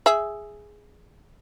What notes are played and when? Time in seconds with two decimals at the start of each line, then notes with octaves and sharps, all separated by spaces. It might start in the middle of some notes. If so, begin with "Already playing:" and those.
0.06 G#4 E5